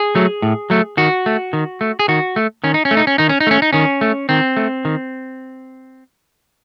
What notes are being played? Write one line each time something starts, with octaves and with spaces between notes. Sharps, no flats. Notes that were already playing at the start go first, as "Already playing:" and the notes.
Already playing: G#4
F#3 A3
A2
F#3 A3
D#3 F#4
A3
D#3
A3
G#4
D#3 F#4
A3
D#3 C#4
D#4
C#4
A3
D#4
C#4
D#3 D#4
C#4
D#4
A3 C#4
D#4
D#3 C#4
A3
D#3 C4
A3
D#3